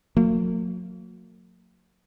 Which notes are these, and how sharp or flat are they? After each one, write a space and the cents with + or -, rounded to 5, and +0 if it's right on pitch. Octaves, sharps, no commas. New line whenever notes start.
F#3 -40 A#3 -40